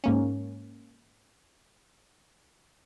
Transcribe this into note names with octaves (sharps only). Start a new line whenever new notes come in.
G#2 A#3 C#4